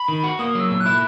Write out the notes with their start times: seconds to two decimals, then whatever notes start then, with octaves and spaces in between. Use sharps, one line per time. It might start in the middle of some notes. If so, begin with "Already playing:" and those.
Already playing: B5
0.08 D#3
0.24 F#4
0.39 A#3 D#6
0.55 F#3
0.60 E6
0.71 A#2
0.80 F#6
0.86 E4